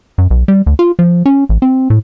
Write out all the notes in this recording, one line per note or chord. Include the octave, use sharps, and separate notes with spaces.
F#2
B1
G3
D2
F4
F3
C#4
A1
C4
A2